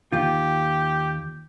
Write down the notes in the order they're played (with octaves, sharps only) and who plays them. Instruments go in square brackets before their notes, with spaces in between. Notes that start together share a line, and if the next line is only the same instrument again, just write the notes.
[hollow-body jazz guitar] D#2 D#3 F4 [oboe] G4